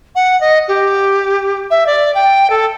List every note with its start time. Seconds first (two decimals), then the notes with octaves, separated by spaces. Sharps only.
0.15 F#5
0.41 D#5
0.68 G4
1.70 E5
1.87 D5
2.15 G5
2.50 A4